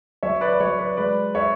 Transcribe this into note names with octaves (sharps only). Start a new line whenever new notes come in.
F#3 C#5 E5
B4 D5
D5
F#3 C#5
B4 D5
G#3 B4 D5
C#5 E5